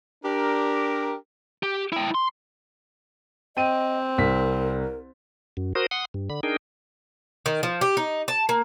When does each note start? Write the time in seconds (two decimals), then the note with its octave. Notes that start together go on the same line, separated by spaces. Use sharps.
0.24 D4 G4 A#4
1.63 G4
1.92 E4 G5
2.15 C6
3.57 C4 D#5 G5 D#7
4.18 C2 A#4 B6
5.57 F#2
5.75 F#4 A#4 C5 D#6
5.91 F#5 C6 D#6
6.14 G2
6.30 D3 B5
6.43 D4 D#4 G#4 A#4 G5
7.46 D#3
7.63 F3
7.81 G4
7.97 D#4
8.28 A5
8.49 A#3